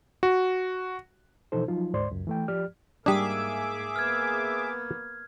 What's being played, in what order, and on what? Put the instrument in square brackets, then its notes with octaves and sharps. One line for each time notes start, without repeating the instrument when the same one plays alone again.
[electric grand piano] F#4
[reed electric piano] B2 E3 F3 D#4 A4 C5
F3 F#3 D#4 F4
D2 G#2 C5 D5 C6
C#2 F#2
E3 A3 G5
F3 G4 D5 F6
[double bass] G#2 A#3 [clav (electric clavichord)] G3 D4 [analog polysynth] G#4 E5 D6
[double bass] A#3 B3 [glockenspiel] F6 G#6